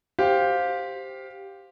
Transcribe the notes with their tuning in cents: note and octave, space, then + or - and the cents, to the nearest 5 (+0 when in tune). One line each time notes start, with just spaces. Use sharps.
G4 +0 C5 +0 F5 +15